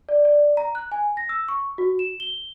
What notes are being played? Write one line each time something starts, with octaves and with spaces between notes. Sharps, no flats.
D5
D5
A#5
F#6
G#5
A#6
E6
C#6
F#4
E7
G7